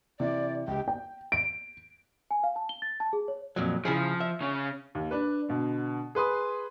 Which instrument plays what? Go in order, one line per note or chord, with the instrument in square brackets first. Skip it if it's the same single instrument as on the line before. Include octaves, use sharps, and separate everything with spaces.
[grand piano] C3 E3 [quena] D5
[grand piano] C#2 G4 [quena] G5
[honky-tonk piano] G5
D7
[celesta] G#5
F5
A5
G7
A6
A5
G#4
C#5
[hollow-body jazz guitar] F2 A#2 F#3
[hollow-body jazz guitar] C#3 E4 G#4 [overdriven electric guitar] F3
[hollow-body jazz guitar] E5
[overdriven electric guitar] C#3 C#4
[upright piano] D#2
D4 B4
B2 D3
G#4 B4 C6 D#6